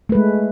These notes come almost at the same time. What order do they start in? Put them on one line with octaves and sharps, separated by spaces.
A3 B4 G#3